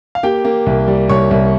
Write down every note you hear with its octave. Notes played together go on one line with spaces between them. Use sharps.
F5
A#3 G4 G5
A#3
C2
G3
C2 C#5 C#6
C2